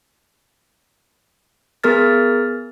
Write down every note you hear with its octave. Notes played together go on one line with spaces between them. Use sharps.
B3 G#4 A#4 F6 A6